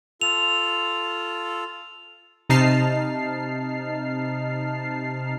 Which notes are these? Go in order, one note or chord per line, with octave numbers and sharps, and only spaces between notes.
F4 A4 F7
C3 D#4 A5 F6 C7